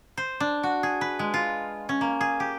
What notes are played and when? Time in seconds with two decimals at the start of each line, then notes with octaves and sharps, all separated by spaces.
0.17 C5
0.40 D4
0.63 F#4
0.83 G#4
1.01 B4
1.19 G#3
1.34 F4
1.89 C#4
2.01 A#3
2.21 G#4
2.40 G4